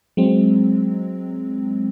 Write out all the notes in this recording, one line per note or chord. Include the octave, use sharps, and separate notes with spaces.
F#3 G#3 C4